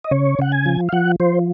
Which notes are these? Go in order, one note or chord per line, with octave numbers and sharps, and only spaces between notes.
D#5
C#3 C#5
C#3 F#5
G#5
F3
F5
F3 F#5
F3 C5